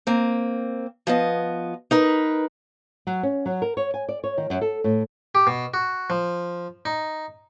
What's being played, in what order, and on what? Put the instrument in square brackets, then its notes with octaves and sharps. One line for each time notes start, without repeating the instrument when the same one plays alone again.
[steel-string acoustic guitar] A#3 C4
F3 B3 D#5
D#4 A#4 B4
[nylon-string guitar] F#3
C#4
F#3
A#4
C#5
G#5
D5
C#5
D#3
F#2
A4
A2
[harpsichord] G4
B2
F#4
F3
D#4